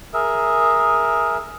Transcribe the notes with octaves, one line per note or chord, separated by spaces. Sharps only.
G#4 A#4 E5